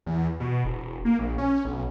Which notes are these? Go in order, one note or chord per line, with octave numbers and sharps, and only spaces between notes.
E2
B2
E1
A#3
A#1
C#4
B1